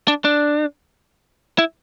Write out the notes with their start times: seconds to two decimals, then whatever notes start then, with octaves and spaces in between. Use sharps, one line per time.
0.08 D4
0.25 D4
1.58 E4